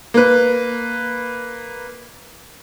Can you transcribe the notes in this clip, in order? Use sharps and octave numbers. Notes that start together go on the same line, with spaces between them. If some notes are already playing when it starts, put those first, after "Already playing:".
A#3 B4